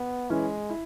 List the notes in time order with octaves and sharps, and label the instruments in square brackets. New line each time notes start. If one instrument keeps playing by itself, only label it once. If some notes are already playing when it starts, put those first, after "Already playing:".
Already playing: [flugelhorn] B3
[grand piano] E3 C#4 E4 [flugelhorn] G#3
[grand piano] E4